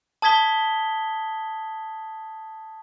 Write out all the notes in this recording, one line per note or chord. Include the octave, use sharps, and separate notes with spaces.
A5 D#6 G#6 B6 G7